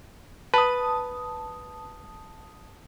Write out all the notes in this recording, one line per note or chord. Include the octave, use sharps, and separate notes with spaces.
B4 A5 D#6